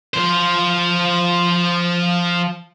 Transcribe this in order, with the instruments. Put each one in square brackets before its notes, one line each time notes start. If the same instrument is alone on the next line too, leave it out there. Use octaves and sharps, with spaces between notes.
[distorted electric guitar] F3 C5